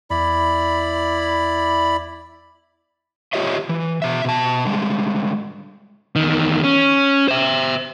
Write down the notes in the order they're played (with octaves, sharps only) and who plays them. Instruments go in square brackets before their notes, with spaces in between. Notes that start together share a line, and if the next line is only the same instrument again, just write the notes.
[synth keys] E2 [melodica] E4 D5 B5
[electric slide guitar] F4 G4 C#5 D#5 E5
E3
B2 E5
B2 A5
D3 G3 G#3
[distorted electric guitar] E2 D#3
C#4
C5 E5